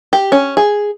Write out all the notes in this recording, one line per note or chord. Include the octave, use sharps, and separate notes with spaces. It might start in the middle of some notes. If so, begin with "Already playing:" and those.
G4
C#4
G#4